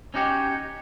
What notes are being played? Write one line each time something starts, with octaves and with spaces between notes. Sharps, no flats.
C#4 D#4 F#4 G4 C#5